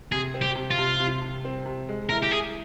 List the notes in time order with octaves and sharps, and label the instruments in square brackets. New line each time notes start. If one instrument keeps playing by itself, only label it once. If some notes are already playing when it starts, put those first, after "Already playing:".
[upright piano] C3 [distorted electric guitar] G#4
[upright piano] C4
[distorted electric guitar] G4
[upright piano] C3
[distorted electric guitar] F4
[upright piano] C3
C3
C3
C4
C3
G#3
[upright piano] E4 [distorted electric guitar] A#4
[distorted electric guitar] G4
[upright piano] E4 [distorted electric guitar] G#4